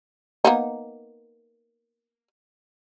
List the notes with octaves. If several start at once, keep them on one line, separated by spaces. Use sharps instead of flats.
A#3 B3 D#4